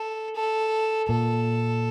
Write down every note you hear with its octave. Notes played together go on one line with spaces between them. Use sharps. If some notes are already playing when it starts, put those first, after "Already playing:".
Already playing: A4
A4
A#2 A4